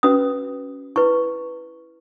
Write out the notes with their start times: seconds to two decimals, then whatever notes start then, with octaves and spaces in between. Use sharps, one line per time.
0.03 C#4 F#4 B4 D#6
0.96 E4 B4 C#6